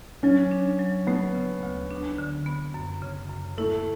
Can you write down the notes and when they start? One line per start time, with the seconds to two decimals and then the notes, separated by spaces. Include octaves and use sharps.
0.23 F#3 C#4
0.51 D4
0.79 F#3
1.07 A3 B3
1.35 C#3
1.63 D2
1.91 D4
2.18 D3
2.46 B3
2.74 F#2
3.02 C#3
3.30 F#2
3.58 A3 E4